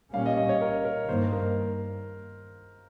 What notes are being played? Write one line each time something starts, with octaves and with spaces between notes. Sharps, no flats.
A#2 G3 A#3 C#4 F5
D#5
D#5
C#5
A#4
A#4
G2 D#3 A#3 C5
A#4